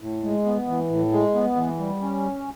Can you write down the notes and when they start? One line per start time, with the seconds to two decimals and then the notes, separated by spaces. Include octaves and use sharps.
0.01 A2
0.23 G#3
0.45 B3
0.68 E3
0.90 A2
1.12 G#3
1.35 B3
1.56 E3
1.79 G3
2.02 C#4